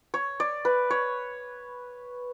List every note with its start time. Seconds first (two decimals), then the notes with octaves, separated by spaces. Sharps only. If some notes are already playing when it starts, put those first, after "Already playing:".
0.14 C#5
0.40 D5
0.65 B4
0.90 C#5